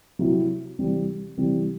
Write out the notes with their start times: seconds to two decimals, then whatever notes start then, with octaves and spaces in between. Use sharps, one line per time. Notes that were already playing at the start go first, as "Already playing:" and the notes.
0.19 C3 F#3 C4 E4
0.79 C3 E3 G3 C4
1.37 C3 E3 G3 C4